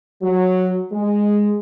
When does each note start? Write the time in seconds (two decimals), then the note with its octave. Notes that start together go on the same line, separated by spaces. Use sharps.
0.22 F#3
0.92 G#3